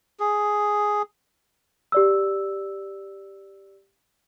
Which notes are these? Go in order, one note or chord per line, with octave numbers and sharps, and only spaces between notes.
G#4
G4 D5 E6